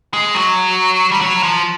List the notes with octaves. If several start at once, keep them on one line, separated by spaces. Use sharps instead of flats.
G#3
F#3
G3
F#3
F3